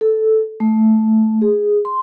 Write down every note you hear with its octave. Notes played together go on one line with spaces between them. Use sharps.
A4
A3
G#4
C6